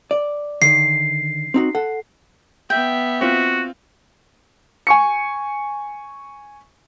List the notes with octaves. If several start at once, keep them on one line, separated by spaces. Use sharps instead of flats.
D5
D3 D#3 C7
C4 D#4 F#4
A4 F#5
B3 E5 G5
C4 F4 F#4
G#5 C#6 C#7